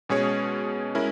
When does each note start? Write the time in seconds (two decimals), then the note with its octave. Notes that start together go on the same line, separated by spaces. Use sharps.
0.09 B2 G#3 C#4 G#4 C#5
0.95 G#3 C#4 E4 A#4